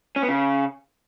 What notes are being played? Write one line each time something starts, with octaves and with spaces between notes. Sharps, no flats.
C#4
B3
C#3